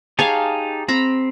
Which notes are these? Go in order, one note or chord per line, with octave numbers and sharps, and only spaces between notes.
D#4 G4 G#4 C#5 F5 A5
C4 A#5 B5